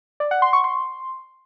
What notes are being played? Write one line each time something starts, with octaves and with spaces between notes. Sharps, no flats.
D5
F#5
C6
C#6
C6